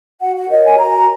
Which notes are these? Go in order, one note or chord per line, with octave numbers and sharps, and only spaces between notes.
F#4 F#5
F#5
A#4 C#5 D#5
G#5
F#4 A#5